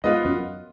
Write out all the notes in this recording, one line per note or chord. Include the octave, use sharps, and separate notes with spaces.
G#2 B3 F4 B4 D#5
F#2